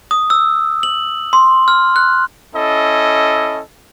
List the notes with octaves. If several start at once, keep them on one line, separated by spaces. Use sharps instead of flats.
D#6
E6
F#7
C6
F6
F#6
C#4 E4 A4 D#5